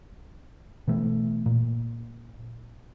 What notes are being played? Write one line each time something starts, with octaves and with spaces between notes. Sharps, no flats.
B2 E3 A3
A#2